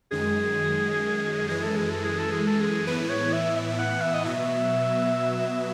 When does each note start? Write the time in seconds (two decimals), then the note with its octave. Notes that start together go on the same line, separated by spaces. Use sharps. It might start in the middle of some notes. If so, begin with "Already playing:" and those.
0.11 F#2 D#3 G#3 G#4
1.49 F#2 E3 G#3 G#4
1.63 A4
1.77 G#4
1.91 A4
2.05 G#4
2.19 A4
2.32 G#4
2.47 A4
2.61 G#4
2.86 A2 E3 B3 E4 B4
3.10 C#5
3.33 E5
3.56 E5
3.79 F#5
4.02 E5
4.14 D#5
4.25 B2 F#3 B3 E5